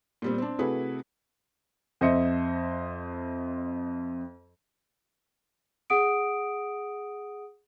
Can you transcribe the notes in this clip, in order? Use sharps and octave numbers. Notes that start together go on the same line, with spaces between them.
A#2 G3 C4
C4 D4
C3 A3 E4 F#4 G#4 B4
F2 C5 D#5 E5 C#7
G#4 F#5 D#6 D7